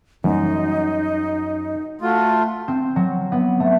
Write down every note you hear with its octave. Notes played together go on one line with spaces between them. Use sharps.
F#2 E3 G3 A#3 D#4
A3 F4 F#4
C4
F#3
B3
A3